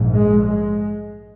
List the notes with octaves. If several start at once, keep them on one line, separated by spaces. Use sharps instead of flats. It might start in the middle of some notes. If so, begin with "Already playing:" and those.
Already playing: A#1 G#2
G#3
G#3